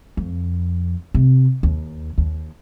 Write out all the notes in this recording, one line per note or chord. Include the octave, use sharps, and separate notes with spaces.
F2
C3
D#2
D#2